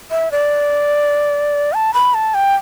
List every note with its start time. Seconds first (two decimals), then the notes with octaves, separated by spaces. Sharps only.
0.11 E5
0.32 D5
1.73 A5
1.94 B5
2.14 A5
2.34 G5